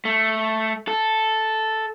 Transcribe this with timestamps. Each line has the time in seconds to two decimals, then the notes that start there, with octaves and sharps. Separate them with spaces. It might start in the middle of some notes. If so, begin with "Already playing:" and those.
0.05 A3
0.88 A4